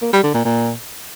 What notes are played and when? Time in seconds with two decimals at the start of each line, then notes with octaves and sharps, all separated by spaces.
0.02 A#3
0.13 G3
0.23 D3
0.34 A#2
0.45 A#2